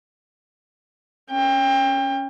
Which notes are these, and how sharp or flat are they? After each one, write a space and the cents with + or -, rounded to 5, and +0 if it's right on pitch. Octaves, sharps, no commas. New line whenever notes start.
C#4 +0 G5 +25